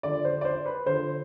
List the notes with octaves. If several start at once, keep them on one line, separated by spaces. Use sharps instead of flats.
D3 F3 D5
C5
D5
C5
B4
D3 F3 C5